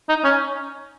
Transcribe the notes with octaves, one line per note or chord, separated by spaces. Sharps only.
D#4
C#4